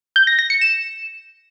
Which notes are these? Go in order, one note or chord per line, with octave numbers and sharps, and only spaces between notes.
G6
A#6
A#6
C#7
E7